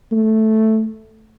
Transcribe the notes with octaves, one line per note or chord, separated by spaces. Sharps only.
A3